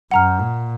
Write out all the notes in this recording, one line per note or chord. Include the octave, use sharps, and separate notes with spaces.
F#2 F#5 A#5 F6
A#2